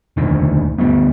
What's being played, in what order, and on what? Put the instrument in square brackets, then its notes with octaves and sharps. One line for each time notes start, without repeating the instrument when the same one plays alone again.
[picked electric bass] E1 D2 D#3
D2 G3 B3